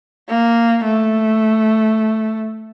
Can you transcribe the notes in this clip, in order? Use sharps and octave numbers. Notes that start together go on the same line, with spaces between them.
A#3
A3